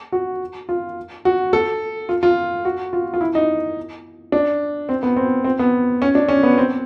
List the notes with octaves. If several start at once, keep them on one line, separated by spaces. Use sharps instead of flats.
F#4
F4
F#4
A4
F4
F4
F#4
F4
F4
E4
D#4
D4
C4
B3
C4
C4
B3
C#4
D4
C#4
B3
C4